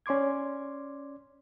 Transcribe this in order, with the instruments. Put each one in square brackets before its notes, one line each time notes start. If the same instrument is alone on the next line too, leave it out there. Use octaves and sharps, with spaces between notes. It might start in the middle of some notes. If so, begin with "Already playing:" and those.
[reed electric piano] C#4 D5 C6 D6 G#6